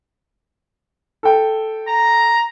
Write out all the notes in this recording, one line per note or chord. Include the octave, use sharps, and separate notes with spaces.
A4 G5
A#5